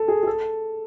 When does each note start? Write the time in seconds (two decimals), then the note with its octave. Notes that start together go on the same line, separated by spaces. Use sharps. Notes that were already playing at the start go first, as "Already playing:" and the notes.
Already playing: A4
0.08 G#4
0.23 G#4
0.27 A4